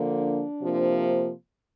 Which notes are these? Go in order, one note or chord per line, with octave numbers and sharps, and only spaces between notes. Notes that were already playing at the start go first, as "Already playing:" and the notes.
Already playing: D3 F3 A#3
D4
C3 F3 A#3